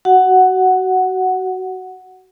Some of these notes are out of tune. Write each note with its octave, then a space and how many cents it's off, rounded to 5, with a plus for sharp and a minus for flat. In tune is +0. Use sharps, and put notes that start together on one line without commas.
F#4 +20 F#5 +0